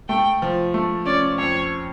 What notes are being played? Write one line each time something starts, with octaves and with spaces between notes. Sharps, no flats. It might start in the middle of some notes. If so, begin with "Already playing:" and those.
A3 G5
F3
A3
C#4 D5
F2 C#5